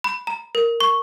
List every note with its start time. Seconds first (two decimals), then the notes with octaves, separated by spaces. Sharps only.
0.04 B5
0.27 A#5
0.55 A#4
0.80 C#6